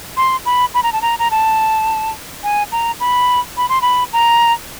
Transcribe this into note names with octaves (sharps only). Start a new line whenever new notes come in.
C6
B5
B5
A#5
A5
A#5
A#5
A5
G#5
A#5
B5
B5
C6
B5
A#5